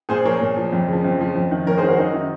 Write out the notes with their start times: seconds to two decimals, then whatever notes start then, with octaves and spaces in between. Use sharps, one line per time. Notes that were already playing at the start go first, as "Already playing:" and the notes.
0.09 A#2 G#4 C5
0.25 F3 A#4 C#5
0.41 A#2
0.56 F3
0.72 F2
0.88 C#3 F3
1.04 F2
1.20 C#3 F3
1.35 F2
1.51 D#3
1.67 F2 A#4 C#5
1.77 G#4 C5
1.83 D#3
1.88 F#4 A#4
1.98 F#2 D#4 F#4
2.14 D#3